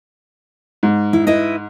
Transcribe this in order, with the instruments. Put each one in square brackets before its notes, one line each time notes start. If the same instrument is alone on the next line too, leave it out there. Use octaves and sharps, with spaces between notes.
[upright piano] G#2
[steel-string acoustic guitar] E4
E4 B4 D#5